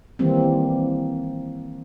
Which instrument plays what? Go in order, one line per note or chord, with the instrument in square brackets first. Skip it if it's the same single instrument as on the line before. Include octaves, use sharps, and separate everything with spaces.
[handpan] D#3 E3 G3 A#3 C4